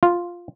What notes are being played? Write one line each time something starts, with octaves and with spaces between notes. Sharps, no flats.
F4